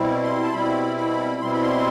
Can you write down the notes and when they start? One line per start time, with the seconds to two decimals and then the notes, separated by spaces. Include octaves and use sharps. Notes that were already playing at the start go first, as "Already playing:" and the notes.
Already playing: B2 G3 C4 E4
0.23 C6
0.43 A5
0.52 B2 G3 C4 E4 B5
0.97 B5
1.42 B2 G3 C4 E4 C6
1.52 B5
1.62 C6